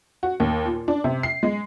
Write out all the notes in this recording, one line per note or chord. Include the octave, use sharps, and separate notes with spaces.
F#4
D#2
A#2
D4
C3
C7
G#3